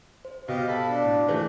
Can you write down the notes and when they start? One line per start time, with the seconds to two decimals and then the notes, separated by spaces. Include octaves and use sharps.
0.25 C5
0.48 B2 G4 D#5 F5
0.68 A4 F5 A5 B5
0.90 D4
1.04 A2
1.28 E3 A3 G#4 A#4 C5